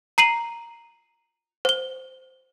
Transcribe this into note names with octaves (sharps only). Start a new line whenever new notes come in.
A#5 C7 D#7 F#7
C5 G7